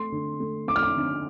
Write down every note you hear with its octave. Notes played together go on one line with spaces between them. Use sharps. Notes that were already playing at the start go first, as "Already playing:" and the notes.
Already playing: A3 C6
D3
A3
A3 D6
F6
D6
D3